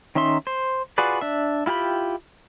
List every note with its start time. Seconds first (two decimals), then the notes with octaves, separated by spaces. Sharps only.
0.15 D#3 C#4 D#4 E5 C6
0.47 C5
0.98 F4 F#4 G#4 B4 D5
1.21 D4 E5
1.66 E4 F4 G4 G5 B5